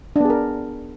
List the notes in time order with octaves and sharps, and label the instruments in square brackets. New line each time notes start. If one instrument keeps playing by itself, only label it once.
[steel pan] D4
B3
G#4
A#4